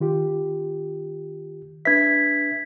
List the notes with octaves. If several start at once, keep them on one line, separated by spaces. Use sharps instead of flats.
D#3 F4 G4
D4 B4 E5 G#6 B6